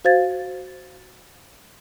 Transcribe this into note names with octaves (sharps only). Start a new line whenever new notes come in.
F#4 C5 F5 G#6 A6